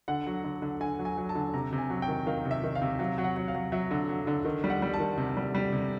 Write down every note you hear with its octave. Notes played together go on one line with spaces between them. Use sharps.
D3 F#5
F#3
D3
D3
D3 G#5
F#3
G#5
F#3
A5
D3
C3 A#5
C3
G#5
F#3
G5
D#3
D#3 F5
C3
E5
D#3
F5
C3
F#3 F5
F#3
F#5
F#3
F5
F#3
F#3 E5
D3
F#3
D3
D#3
G3
F#5
G3
A5
D#3
C3
G3
G3
C3